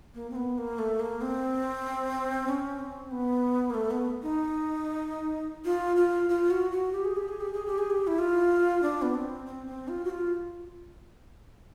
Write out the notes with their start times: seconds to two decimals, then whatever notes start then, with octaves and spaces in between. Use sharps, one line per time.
0.15 A#3
0.30 C4
0.36 B3
0.58 A#3
0.79 A3
1.00 A#3
1.21 C4
2.47 C#4
2.80 C4
3.11 B3
3.70 A#3
3.74 A3
3.91 B3
4.23 D#4
5.65 F4
5.96 F4
6.29 F4
6.50 F#4
6.72 F#4
6.93 G4
7.05 G#4
7.16 G4
7.28 G#4
7.41 G4
7.53 G#4
7.66 G4
7.78 G#4
7.90 G4
8.07 E4
8.19 F4
8.83 D4
9.02 B3
9.14 C4
9.46 C4
9.67 C4
9.88 F4
10.05 F#4
10.10 F4